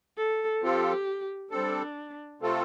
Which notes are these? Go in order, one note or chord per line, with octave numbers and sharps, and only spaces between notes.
A4
F3 C4 F4 G4 A4
G3 C4 D4 A4
C3 A3 C4 F4 A4